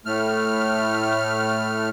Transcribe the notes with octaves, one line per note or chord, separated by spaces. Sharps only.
A2 A3 F6